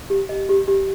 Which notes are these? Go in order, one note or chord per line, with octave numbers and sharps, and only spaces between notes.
G4
D#5
G4
G4